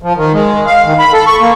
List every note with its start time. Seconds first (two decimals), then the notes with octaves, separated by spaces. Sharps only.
0.02 F3
0.16 D#3
0.33 G#3
0.66 F5
0.85 D#3
0.99 B5
1.13 A4
1.27 C#6
1.40 A#3